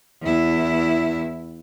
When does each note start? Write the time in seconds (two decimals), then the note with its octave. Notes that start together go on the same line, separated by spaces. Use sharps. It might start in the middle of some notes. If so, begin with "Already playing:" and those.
0.22 E2 E4